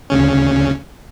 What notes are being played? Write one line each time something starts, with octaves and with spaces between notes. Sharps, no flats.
D2 C#3 C#4